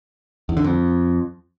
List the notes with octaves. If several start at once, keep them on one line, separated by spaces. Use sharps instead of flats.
E2
D3
F2